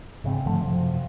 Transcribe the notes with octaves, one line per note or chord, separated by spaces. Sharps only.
G#2 C#3 C4
G#2 D3 F3 A3
F#2 C3 F3